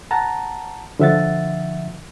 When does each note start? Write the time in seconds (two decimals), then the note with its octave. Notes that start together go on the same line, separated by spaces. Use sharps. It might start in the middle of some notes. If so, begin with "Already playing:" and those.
0.11 F#5 A5 A#5
0.99 D3 F3 E5 F#5 A6